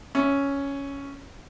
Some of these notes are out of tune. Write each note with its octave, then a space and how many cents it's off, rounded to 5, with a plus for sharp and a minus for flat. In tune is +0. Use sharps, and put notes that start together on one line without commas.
C#4 +5 E5 +0